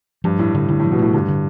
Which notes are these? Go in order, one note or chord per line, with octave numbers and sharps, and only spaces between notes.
G2 F3
A2 A3
A2 D3
A2 D3
A2 F3
B2
A2 A3
G2 D3
D3